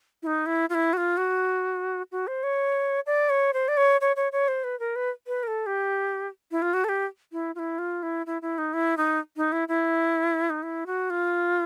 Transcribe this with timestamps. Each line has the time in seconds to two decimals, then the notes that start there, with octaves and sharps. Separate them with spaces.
0.22 E4
0.27 D#4
0.46 E4
0.69 F4
0.74 E4
0.93 F#4
0.97 F4
1.17 F#4
2.12 F#4
2.27 C5
2.43 C#5
3.06 D5
3.29 C#5
3.53 C5
3.68 D5
3.77 C#5
4.01 C#5
4.16 C#5
4.32 C#5
4.48 C5
4.64 B4
4.79 A#4
4.96 B4
5.27 B4
5.43 A#4
5.47 A4
5.66 G4
6.51 E4
6.62 F4
6.73 F#4
6.84 A4
6.89 G4
7.32 E4
7.55 F4
7.59 E4
7.78 F4
8.03 E4
8.26 E4
8.42 E4
8.58 D#4
8.73 E4
8.97 D#4
9.37 D#4
9.52 E4
9.68 E4
10.50 D#4
10.63 E4
10.86 F#4
11.10 F4